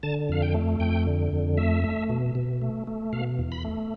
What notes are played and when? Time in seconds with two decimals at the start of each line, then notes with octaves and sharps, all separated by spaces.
0.03 D3 A5
0.29 F2 F5
0.42 G5
0.54 A3
0.80 F2 G5
1.07 D3
1.33 F2
1.57 A3 E5
1.84 A3
2.09 B2
2.35 B2
2.61 A3
2.87 A3
3.13 B2 F5
3.39 E2
3.52 B5
3.65 A3